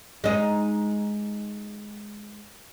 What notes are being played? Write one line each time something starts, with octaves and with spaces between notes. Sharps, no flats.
G#3 D#4